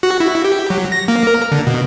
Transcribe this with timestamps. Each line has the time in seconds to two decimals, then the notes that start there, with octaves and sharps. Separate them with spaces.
0.03 F#4
0.20 E4
0.45 G4
0.70 F#3
0.92 A#6
1.08 A#3
1.27 A#4
1.52 D3
1.67 B2